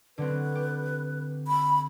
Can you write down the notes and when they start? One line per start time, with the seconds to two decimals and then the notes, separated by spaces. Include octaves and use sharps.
0.18 D3 F#3 C4 B4
0.55 G4
1.47 B5